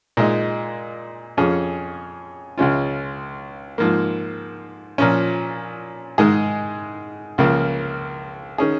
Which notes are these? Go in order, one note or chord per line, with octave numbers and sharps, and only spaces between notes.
A#2 G#3 D#4
F2 F3 C#4 G#4
C#2 C#3 G#3 C#4 F4
G#2 F3 A#3
A#2 F3 C#4
G#2 D#3 G#3 D#4 G#4
C#2 C#3 F3 A#3
D#3 C#4 G#4